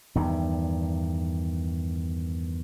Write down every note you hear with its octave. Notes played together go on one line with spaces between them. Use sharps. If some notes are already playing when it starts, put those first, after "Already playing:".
E2 G2 D#3